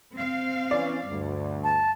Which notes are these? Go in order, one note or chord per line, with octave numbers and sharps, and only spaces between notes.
C4 F5
E3 C#4 D5
D2 G2
A5